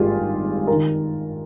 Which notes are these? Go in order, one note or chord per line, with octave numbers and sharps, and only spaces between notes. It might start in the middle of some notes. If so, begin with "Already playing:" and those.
Already playing: G#1 G2 D#3 F4 G4 G#4
A#4
D#3